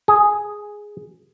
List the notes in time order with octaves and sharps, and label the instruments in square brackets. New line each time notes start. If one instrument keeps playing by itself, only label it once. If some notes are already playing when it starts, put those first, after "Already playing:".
[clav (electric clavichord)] G#4